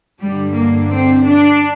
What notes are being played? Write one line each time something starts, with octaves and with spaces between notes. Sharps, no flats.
G2 D3 G3
A#3
C4
D4